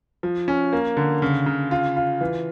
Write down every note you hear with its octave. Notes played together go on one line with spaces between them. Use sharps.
F3
C#4
A#3
D3
C#3
C#3
F4
F4
E3